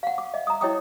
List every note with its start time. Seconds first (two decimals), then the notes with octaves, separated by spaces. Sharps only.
0.03 F5 F#5
0.18 D6
0.34 D#5 E5
0.47 A#5 D#6
0.61 E4 C#5 D#5 G5 D6 D#6